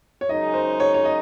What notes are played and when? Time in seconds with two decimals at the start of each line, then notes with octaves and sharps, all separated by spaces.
0.21 C#5
0.29 F#2 C#3 G#3 D#4 D#5
0.54 C5
0.80 C#5
0.94 C#5
1.05 D#5